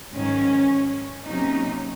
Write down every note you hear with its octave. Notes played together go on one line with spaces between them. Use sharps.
G#2 D#3 F#3 C#4
C3 F#3 A#3 C#4 D#4